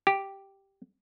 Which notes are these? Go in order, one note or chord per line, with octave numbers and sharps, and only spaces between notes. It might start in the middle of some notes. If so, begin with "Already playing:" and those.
G4